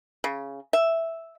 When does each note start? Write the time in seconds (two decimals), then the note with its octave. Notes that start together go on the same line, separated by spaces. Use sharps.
0.24 C#3
0.73 E5